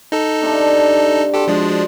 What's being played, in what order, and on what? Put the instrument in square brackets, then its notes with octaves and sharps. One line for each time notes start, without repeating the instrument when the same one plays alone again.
[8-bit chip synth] D#4 A4
[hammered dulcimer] G2 C3 D4
[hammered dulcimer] F#4 C5 [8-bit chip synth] G4 A4
[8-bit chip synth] F3 G#3 D4